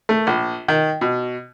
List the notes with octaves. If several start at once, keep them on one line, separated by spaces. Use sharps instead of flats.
A3
A#1
D#3
B2